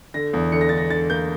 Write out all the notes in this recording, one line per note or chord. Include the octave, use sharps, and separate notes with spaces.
D3 A#6
E2
D3 C#7
A#6
D3 A6
A#6
D3 A6
A#3 G6